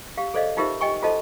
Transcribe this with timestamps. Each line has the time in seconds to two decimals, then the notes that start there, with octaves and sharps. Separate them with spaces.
0.17 G4 F5
0.34 G#4 A4 C5 D5 D#5 F5
0.57 D#4 F4 G4 A#4 C5 E5
0.81 G4 D#5 G5 G#5 C#6
1.02 F4 F#4 A4 C5 D#5 A5